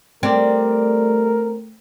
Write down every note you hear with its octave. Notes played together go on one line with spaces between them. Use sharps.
G3 A3 C4 A#4 D5